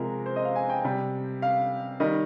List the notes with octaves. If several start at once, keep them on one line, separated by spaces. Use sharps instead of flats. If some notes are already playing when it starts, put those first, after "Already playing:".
Already playing: C3 F3 G#3 A#4
C5
D#5
F5
G#5
G5
C3 G3
F5
D#3 G3 D#5